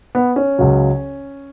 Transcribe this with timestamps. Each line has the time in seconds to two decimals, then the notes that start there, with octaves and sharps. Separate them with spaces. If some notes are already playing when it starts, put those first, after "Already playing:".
0.15 B3
0.36 C#4
0.59 C#2 C#3 F#3